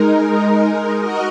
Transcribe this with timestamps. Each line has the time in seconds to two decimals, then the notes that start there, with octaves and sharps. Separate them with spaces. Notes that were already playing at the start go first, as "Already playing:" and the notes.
Already playing: G#3 D#4 A#4
0.99 F#4 A#4 D#5